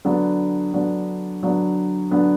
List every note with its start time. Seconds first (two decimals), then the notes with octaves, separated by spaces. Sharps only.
0.05 D3 F#3 B3 D4
0.74 D3 F#3 B3 D4
1.42 D3 F#3 B3 D4
2.11 D3 F#3 B3 D4